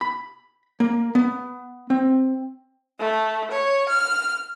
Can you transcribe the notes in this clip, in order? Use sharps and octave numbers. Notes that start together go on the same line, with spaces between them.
B5
A#3
B3
C4
A3
C#5
F6